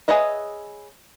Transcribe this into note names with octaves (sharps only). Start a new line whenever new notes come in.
G#4 B4 C#5 D#5 E5